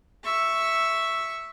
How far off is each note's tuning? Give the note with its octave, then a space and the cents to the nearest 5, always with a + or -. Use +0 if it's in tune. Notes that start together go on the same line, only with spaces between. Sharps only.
E5 +0 C#6 +0